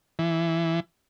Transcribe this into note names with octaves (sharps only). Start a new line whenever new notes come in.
E3